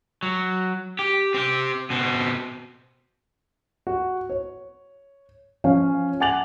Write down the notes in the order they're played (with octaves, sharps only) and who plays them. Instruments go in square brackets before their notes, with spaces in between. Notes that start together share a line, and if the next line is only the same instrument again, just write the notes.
[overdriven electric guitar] F#3
G4
C4 G4
B2 C4
[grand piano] F#4
C#5
F3 C#4 F5 G#5
F#5 G#5 D6 A6 F7 F#7